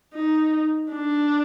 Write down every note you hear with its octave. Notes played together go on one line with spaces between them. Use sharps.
D#4
D4